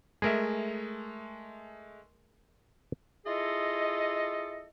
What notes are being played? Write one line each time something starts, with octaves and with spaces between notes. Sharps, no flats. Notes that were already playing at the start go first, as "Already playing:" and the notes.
G#3 A3 G#4 A#4 E5
E4 F4 G#4 A4 D#5